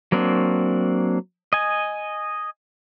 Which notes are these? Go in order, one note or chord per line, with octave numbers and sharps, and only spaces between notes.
F#3 A#3 C4 D4
D#5 G#5